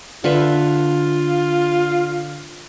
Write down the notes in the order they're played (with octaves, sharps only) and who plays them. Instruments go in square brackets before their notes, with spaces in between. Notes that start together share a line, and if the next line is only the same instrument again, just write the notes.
[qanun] D3 B4 E5 [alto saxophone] F4